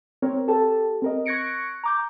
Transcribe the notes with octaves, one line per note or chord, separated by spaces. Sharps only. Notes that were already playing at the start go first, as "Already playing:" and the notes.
C4 A#4 C#5
G4 A4 A5
C4 A#4 D#5
C#6 F#6 G#6 A#6 C#7 D7
A#5 D6 G6